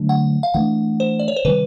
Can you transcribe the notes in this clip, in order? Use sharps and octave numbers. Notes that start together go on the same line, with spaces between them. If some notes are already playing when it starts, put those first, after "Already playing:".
Already playing: D3 F#3 A3 D4
F#5
F5
E3 A3 D4 F#5
C5
D5
C#5
C5
C3 D#3 G3 B4